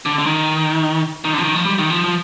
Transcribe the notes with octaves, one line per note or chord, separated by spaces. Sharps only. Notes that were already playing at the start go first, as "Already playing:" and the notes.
D3
D3
D#3
D#3
D3
F3
D#3
F3
G3
D#3
F3
F3